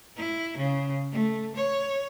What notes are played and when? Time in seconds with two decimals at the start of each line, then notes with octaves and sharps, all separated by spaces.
0.17 E4
0.57 C#3
1.12 A3
1.56 C#5